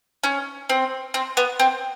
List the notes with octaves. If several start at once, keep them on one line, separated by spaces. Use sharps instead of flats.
C#4
C4
C4
B3
C4